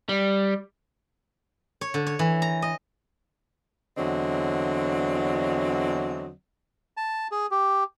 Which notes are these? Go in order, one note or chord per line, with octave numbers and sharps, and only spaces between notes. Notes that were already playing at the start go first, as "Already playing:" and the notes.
G3
C#5
D3
C#5
E3
A#5
D#5
E2 D3 F#3 C4 D5 D#5
A5
G#4
G4